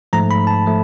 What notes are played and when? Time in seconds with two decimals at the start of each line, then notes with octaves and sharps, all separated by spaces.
0.13 G#2 F3 A3 A#5
0.31 B5
0.47 A5
0.66 F3 A3